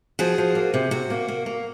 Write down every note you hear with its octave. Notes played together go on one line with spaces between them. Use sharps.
F3 F#4 G#4
F3
A#3
C3
C3 F#4
A#3
A#3
A#3